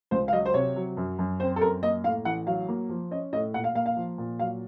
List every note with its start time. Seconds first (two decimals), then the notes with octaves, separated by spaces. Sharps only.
0.11 C#2 C5
0.28 F5
0.33 F#3 D#5
0.46 C5
0.54 C3 C#5
0.76 F#3
0.97 F#2
1.19 F#2
1.40 C4 C5
1.56 A4
1.61 F#2 A#4
1.83 A#3 D#5
2.04 A2 F5
2.25 A1 F#5
2.47 F#3 F5
2.68 A#3
2.89 F3
3.11 C#4 D#5
3.33 A2 D#5
3.54 A#2 F#5
3.64 F5
3.75 A#3 F5
3.86 F5
3.97 F3
4.18 A#2
4.39 F#3 F5